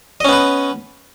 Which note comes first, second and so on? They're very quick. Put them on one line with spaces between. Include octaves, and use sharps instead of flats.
D#5 C#4 B3 B4